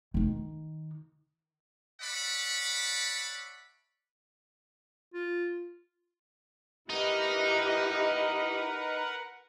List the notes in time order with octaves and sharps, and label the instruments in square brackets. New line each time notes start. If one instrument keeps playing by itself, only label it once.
[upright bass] D#3 D#4
[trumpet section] C#5 D5 E5 F#5 A5 B5
[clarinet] F4
[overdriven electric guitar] D#4 [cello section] E4 G4 D#5 [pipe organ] A#4 B4 F#5